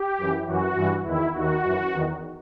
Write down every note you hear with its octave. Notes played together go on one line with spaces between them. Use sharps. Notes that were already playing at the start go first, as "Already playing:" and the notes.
Already playing: G4
F#2 E3
F#2 E3 F#4
G2 E3
E2 D#3 E4
D#2 D#3 F#4
F#2 E3
E2 D#3